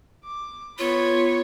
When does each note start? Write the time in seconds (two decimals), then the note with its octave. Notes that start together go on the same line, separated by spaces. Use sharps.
0.24 D6
0.78 B3 F4 C#5 B5